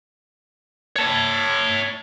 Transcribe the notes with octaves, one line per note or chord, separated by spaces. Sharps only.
C#5 A5